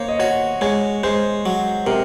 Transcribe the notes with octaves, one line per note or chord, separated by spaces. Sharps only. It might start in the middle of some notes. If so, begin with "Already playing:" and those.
Already playing: A#3 C5 C#5
D#5
F#4 C#5
G#3 C#5
G#3 C5
F#3
C3 A#4